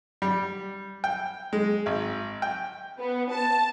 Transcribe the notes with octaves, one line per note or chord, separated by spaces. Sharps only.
G3
G5
G#3
G#1
G5
B3
A5